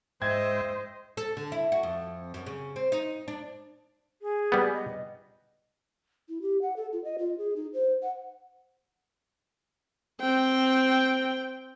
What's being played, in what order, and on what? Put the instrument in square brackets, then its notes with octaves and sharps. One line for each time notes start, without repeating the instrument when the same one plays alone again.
[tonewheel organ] G#2 E5 G5 [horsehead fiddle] C5 [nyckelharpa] D#5 [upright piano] G#6
[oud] A4
D3
E4
F#4
F2
F#2
C#3
C4
D#4
D4
[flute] G#4
[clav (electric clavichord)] G3 B3
[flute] D#5
[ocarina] E4
G4
F#5
A4
F4
D#5
F4
G#4
D#4
C5
F#5
[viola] C4 G5